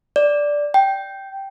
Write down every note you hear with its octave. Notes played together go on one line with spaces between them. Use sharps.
D5
G5